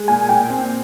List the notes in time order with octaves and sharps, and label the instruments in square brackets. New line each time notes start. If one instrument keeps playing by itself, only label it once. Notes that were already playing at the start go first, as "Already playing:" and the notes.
Already playing: [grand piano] G#3
[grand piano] A#2 [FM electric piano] G#5
[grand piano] A#2 [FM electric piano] G5
[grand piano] C4